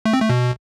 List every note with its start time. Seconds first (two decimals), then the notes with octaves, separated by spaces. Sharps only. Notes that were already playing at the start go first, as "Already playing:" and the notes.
0.05 A3
0.13 C4
0.21 A3
0.29 B2